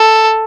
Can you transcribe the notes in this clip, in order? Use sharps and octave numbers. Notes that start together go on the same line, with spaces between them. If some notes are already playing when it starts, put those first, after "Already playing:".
Already playing: A4